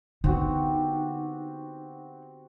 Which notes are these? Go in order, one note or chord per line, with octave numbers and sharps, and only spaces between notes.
D3 B3 C4 D#4 F#4 G4